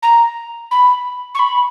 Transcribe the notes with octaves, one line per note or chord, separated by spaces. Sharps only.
A#5
B5
C#6
B5